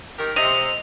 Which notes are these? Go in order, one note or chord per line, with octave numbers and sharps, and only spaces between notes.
D#3 G4 A#4
C3 D#5 F7